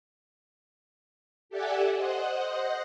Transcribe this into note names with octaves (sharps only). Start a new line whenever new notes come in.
G4 A4 D5 E5 F#5 G#5
C5 D#5 F#5